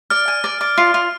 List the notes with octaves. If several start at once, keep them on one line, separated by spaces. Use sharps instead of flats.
D5 F6
G#5
D5
D5
F4
F4